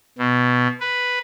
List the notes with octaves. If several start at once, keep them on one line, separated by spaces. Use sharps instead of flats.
B2
B4